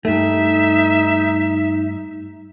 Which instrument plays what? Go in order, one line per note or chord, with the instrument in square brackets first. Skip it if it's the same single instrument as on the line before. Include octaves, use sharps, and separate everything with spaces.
[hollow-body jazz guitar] G2 A3 [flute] D#4 [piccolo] E5